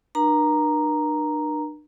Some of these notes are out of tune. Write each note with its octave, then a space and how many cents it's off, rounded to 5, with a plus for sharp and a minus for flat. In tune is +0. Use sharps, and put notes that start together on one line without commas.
D4 +40 A#4 +45 A#5 +0